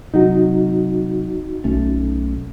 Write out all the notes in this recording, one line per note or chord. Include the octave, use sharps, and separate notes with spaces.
C3 F#3 D#4 F#4
B1 A3 C#4